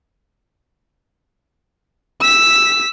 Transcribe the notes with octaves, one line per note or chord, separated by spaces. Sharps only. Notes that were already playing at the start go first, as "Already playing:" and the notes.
E6 B6